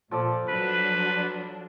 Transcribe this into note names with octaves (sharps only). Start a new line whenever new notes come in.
A#2 F3 A4 D5
F#3 D4 B4